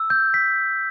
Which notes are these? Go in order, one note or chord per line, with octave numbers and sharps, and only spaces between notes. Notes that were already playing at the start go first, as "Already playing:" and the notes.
Already playing: E6
G6
B6